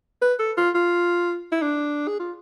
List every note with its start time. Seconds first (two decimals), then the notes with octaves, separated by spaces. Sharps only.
0.22 B4
0.40 A4
0.57 F4
0.75 F4
1.52 E4
1.62 D4
2.08 G#4
2.20 F4